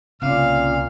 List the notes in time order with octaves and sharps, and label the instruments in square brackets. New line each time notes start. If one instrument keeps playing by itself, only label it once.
[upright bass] C2 [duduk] A#2 [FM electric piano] C#3 C#4 D6 [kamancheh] F5